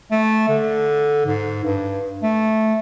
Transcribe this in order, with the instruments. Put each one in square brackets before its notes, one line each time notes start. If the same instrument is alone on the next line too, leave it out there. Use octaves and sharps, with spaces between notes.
[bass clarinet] A3
D3
G#2
G2
A3